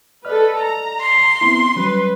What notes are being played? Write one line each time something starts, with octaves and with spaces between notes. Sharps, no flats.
A4 B4 D5 D#5 F6
A#5
C6
B3 C4 E4
F#3 G3 C#4 B4